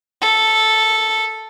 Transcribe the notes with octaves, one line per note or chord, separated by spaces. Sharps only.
A4